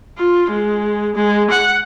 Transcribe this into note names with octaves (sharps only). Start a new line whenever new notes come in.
F4
G#3
G#3
F#5